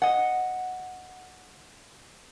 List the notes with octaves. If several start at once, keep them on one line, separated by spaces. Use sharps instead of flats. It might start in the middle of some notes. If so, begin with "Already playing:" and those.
D#5 F#5